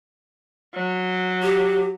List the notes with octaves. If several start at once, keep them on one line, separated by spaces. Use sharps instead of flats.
F#3
G4